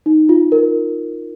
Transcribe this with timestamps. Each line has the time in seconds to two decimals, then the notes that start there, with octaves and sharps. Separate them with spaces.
0.06 D#4
0.29 F4
0.52 A#4